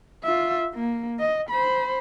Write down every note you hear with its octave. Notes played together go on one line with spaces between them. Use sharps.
F4 E5
A#3
D#5
C5 B5